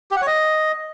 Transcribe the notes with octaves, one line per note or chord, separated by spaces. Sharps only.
G4
F#5
C#5
D#5